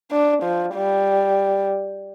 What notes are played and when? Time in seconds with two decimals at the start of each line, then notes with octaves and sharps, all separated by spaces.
0.12 D4
0.43 F3
0.74 G3